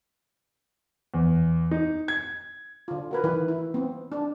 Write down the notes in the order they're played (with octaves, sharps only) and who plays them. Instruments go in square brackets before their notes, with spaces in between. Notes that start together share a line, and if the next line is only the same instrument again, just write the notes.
[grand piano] E2
D#4
G#6
[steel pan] D3 F4
F#4 A#4 B4
D#3 E3 E4 B4
E4
B3 C4
D4